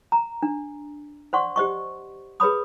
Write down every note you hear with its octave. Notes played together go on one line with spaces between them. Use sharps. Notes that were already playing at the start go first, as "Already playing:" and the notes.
A#5
D4
C5 D5 F#5 C6 C#6
G4 C5 D#5 C#6
G#4 B4 C#5 B5 D#6